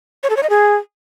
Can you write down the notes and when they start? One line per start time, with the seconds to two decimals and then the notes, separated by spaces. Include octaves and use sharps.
0.23 C#5
0.30 A4
0.36 C#5
0.43 D#5
0.50 G#4